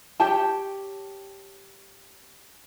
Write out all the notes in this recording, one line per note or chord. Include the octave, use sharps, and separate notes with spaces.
G4 C#5 G5 A5